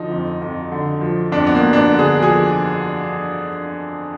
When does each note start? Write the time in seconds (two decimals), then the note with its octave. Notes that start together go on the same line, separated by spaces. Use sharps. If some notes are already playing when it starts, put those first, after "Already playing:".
Already playing: D3 F3 D#4
0.11 F2
0.41 F2
0.72 D3
1.01 F3
1.32 F2 D4
1.47 B3
1.55 A#3
1.62 F2
1.73 D4
1.78 B3
1.91 D3
1.99 G#4
2.21 F3 G#4